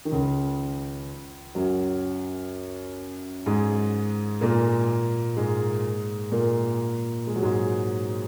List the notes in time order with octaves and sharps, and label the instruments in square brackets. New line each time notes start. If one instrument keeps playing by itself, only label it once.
[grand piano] D#3
C#2 C#3
F#2 F#3
G#2 G#3
A#2 A#3
G#2 G#3
A#2 A#3
G#3
F#3
G#2 G#3